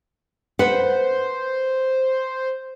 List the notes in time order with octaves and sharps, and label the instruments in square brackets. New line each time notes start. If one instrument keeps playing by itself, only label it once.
[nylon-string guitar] B4 F#5 [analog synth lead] C5